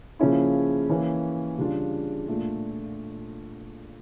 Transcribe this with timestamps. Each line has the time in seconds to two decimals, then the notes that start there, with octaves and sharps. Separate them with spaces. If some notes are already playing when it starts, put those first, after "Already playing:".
0.19 C#3 F3 A#3 C#4 E4
0.89 E3 A#3 C#4
1.58 C#3 G3 D4 F4
2.28 A#2 A3 D4 F4